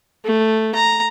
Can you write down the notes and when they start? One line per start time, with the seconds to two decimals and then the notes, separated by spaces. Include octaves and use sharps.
0.25 A3
0.75 A#5